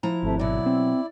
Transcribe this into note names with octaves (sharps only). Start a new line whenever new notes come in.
F3 E4 A#5
G#1 C3 A3
B2 F#3 E4 D5
C4